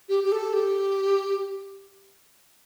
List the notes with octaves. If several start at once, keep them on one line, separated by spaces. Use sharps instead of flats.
G4
G4
A4
G4